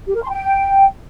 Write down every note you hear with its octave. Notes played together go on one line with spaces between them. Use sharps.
G4
A#4
C6
G5